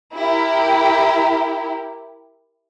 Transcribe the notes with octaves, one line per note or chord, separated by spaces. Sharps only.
E4 G4 A#4